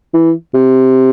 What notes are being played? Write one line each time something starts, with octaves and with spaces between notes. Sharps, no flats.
E3
C3